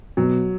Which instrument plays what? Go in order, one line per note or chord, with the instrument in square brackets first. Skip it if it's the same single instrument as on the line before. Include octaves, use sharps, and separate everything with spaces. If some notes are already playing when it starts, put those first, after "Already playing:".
[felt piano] B2 [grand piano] F#3